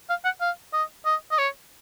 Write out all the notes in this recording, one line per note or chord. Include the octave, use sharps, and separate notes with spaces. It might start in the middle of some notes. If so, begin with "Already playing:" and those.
F5
F#5
F5
D#5
D#5
D#5
C#5